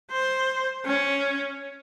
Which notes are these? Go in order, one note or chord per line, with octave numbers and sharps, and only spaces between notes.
C5
C#4